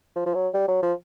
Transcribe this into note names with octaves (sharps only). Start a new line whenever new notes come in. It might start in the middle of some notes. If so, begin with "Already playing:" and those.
F3
F3
F#3
G3
F#3
F3